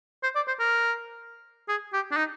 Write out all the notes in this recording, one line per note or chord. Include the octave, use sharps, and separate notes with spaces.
C5
D5
C5
A#4
G#4
G4
D4
D#4